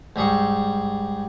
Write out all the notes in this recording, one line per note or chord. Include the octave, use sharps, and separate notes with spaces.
G#2 G3 G#4 C#6